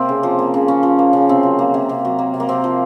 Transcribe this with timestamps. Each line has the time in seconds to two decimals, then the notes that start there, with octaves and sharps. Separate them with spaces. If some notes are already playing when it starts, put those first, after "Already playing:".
Already playing: C3 A#3 C4
0.09 C#3
0.23 F3
0.39 A#3
0.54 C#3
0.68 C#3 C#4
0.83 F3
0.99 A#3
1.13 C#3
1.29 C3 C4
1.43 F#3
1.59 A#3
1.74 C3
1.89 C3
2.05 F#3
2.19 A#3
2.34 C3
2.40 A#3
2.49 C3 C4
2.64 F3